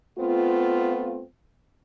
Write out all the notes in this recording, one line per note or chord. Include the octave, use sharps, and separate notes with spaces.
A3 B3 C4 F4